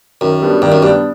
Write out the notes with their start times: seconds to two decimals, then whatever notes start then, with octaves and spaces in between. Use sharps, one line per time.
0.21 F#2 D#3
0.42 G3 B3 D4
0.62 G2 D#3
0.72 F#2
0.83 G2 G3 B3 D4